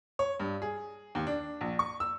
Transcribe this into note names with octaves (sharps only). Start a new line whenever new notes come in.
C#5
G2
G#4
D#2
D4
A#1
C#6
E6